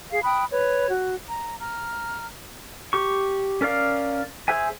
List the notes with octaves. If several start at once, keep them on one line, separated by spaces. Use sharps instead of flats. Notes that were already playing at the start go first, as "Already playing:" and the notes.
G#4 F5
G5 B5 D#6 F#6
B4 C#5
F#4
A#5
A#5 F6
G4 C#6
C#4 A#4 D5 F5
G#4 C5 E5 G#5